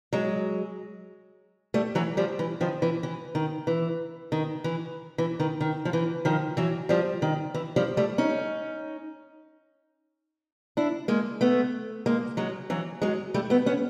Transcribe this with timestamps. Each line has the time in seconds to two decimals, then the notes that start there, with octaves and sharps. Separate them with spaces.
0.13 F#3 G#3
1.74 G3 A3
1.95 E3 F#3
2.17 F3 G3
2.39 E3
2.61 D#3 F3
2.82 E3
3.03 E3
3.35 D#3
3.67 E3
4.32 D#3
4.64 E3
5.18 E3
5.40 D#3
5.61 D#3
5.85 F3
5.93 E3
6.25 D#3 F3
6.57 E3 F#3
6.89 F3 G3
7.22 D#3
7.54 E3
7.76 F3 G3
7.97 G3 A3
8.18 C#4 D#4
10.77 D4 E4
11.08 G#3 A#3
11.41 A3 B3
12.06 G#3 A#3
12.37 F#3 G#3
12.70 E3 F#3
13.02 F#3 G#3
13.34 G3 A3
13.50 A3 B3
13.66 B3 C#4